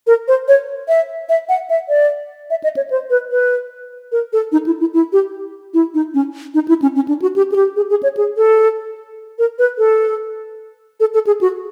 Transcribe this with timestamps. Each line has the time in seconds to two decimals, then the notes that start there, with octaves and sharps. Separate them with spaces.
0.07 A#4
0.28 C5
0.48 C#5
0.88 E5
1.29 E5
1.49 F#5
1.70 E5
1.89 D5
2.50 E5
2.64 D#5
2.77 C#5
2.90 C5
3.10 B4
3.31 B4
4.12 A#4
4.33 A4
4.52 D#4
4.66 E4
4.80 E4
4.93 E4
5.13 G4
5.74 E4
5.94 D#4
6.14 C#4
6.54 D#4
6.68 E4
6.82 C#4
6.95 C#4
7.08 D4
7.22 F#4
7.36 G4
7.52 G#4
7.56 G4
7.76 G#4
7.90 G#4
8.03 C#5
8.17 G#4
8.37 A4
9.39 A#4
9.59 B4
9.78 A4
11.00 A4
11.14 A4
11.27 G#4
11.41 F#4